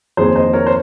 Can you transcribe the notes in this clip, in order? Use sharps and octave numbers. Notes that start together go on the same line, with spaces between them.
F2 D#3 A#3 G#4 C5
C5 D#5
A#4 C#5
C5